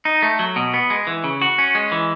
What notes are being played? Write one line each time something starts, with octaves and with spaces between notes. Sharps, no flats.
D#4
A3
F#3
B2
B3
G#3
E3
C#3
F#4
C#4
G#3
E3